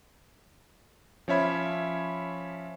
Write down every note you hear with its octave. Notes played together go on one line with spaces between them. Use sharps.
F3 C#4 C#5 E5 B5 G#6